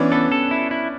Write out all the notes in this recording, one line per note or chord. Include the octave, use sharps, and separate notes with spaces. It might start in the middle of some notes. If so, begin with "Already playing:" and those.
Already playing: E3 B3 C#4 D4
B3 A4
A4
E4
E4